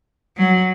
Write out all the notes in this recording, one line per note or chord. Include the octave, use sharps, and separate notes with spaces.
F#3